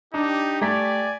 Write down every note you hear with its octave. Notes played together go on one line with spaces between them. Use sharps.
D4 D#4 G4
A3 D5 G#5 A#5 B6